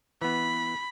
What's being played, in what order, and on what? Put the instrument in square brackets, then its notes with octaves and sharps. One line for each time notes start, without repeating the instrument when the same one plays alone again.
[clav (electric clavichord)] E3 B3 [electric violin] B5